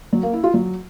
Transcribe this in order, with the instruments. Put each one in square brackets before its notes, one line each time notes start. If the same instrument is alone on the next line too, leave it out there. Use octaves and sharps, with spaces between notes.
[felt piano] F#3
A#3
E4
F4
F#3